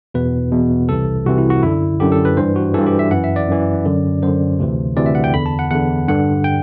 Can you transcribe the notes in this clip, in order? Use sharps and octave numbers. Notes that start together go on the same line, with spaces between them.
E2 B2 B4
E2 B2
C2 C3 E3 A4
C2 C3 E3 F#4
E4
F#4
F#2 D3 E4
F#2 D3 G4
A4
B4
G2 E3 C5
F#4
G2 E3 A4
G4
E5
F#2 E3 F#5
E5
D5
F#2 E3
F#2 D3
F#2 D3 C5
D2 C3 E3
D2 C3 E3 D5
E5
F#5
G5
E2 D3 B5
A5
F#5
E2 D3 F#5
G2 D3 F#5
G5